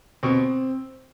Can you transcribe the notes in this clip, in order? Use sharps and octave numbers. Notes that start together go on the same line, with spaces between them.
B2 C4